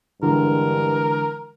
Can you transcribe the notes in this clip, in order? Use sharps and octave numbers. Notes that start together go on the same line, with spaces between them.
G2 D3 E3 G#3 A#4